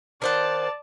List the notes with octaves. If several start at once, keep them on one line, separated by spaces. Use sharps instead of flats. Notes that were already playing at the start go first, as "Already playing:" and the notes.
D#3 C5 D5 F#5 A5